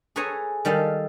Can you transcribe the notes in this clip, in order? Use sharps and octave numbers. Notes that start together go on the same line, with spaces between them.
G#4 A4 B4 C#5 G#5 A#5
D#3 G3 A4 F5